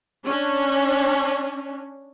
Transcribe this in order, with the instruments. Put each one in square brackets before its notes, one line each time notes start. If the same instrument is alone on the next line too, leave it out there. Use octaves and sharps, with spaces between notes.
[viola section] C#4 D4